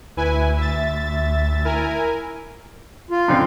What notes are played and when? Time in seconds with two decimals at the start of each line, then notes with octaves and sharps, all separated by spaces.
0.17 D2 E4 B4 G#5
0.58 E5 A6
1.64 E4 A#4 G#5
3.11 F4
3.28 F#2 D3 C4